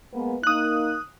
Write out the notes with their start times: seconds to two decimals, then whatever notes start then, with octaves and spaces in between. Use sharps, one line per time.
0.14 G#3 A#3 B3
0.43 A#3 D#4 D#6 F#6